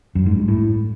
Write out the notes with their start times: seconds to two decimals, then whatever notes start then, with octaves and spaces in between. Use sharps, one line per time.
0.15 F#2
0.26 G#2
0.37 G2
0.48 A2